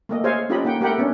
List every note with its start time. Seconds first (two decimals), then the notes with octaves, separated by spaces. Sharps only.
0.09 A3 A#3 D#5
0.24 G#4 C5 C#5 D#5 F5 G#5
0.49 C#4 F4 G4 A4 D#5 B5
0.65 A#3 D#4 F#5 G5
0.81 A3 G4 A#4 F#5 G5 B5
0.98 B3 C#4 D4